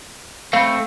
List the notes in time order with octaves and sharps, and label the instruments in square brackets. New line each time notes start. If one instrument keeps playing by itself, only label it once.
[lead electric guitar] A3 C4 [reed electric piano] F5 B5